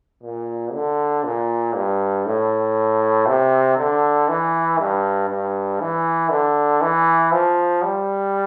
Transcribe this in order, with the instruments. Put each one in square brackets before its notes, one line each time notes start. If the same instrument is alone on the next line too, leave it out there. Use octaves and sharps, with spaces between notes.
[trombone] A#2
D3
A#2
G2
A2
C3
D3
E3
G2
G2
E3
D3
E3
F3
G3